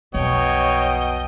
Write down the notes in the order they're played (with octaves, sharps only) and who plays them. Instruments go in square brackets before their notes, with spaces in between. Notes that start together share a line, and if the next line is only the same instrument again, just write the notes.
[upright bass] B1 F2 [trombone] B2 [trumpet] C#5 [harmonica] D#5 G5